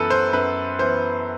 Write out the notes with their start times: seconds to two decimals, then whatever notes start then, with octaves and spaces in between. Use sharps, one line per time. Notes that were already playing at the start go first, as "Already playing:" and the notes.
Already playing: F#2 E3 B3 A4 B4
0.10 C5
0.33 F#2 B4
0.79 E3 B3 C5